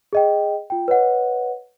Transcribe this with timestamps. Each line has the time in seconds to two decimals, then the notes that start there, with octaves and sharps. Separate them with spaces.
0.13 G#4 D#5 G5
0.70 F4 G5
0.88 B4 C#5 D#5 F#5